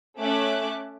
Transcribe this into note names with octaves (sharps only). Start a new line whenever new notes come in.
A3 C#4 E5 D6 F#6